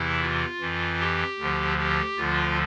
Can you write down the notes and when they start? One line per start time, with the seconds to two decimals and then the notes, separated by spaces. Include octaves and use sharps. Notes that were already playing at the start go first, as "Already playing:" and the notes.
Already playing: E2 C3 E3 E4
0.21 F4
0.61 F2 E3
1.00 G4
1.39 D2 D3 F3
1.78 G4
2.17 D2 D3 F3 F4